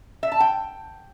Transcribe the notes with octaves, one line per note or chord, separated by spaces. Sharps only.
E5
A5
G5